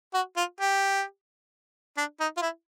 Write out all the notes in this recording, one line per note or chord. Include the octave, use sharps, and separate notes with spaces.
F#4
F4
G4
D4
D#4
F4
E4